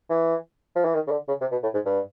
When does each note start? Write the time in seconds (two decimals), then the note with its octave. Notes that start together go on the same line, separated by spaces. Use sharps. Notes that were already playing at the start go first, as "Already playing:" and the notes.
0.09 E3
0.76 F3
0.85 E3
0.95 D#3
1.07 C#3
1.11 D3
1.28 C#3
1.41 C3
1.51 B2
1.63 A2
1.74 G#2
1.85 G2